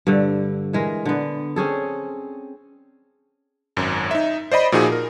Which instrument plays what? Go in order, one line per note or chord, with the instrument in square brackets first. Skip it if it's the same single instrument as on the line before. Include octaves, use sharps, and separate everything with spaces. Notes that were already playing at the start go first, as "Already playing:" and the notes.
[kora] G2 D3
E3 G#3 A#4
D3 B3
C4 C#4 G#4 A4
[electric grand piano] G#1 F#2
D#4 E5
C5 D5 D#5 B5
A#2 F3 D#4 F#4 G#4
A#4